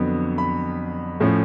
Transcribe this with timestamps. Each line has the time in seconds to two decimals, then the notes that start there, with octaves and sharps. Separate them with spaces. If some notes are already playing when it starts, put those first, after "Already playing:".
Already playing: F2 D3 F#3 B3
0.38 B5
1.20 A2 F3 A3 C#4